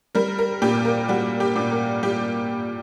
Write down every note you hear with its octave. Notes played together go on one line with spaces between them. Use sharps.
G3 A#4
A#4
A#2 G4
A#4
G3 F#4
G4
A#2
A#4
G3 G4